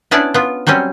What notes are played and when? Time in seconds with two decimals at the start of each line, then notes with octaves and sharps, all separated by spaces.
0.11 B3 C#4 D4 E4 D5 A5
0.34 B3 F4
0.67 F#3 G3 C4 C#4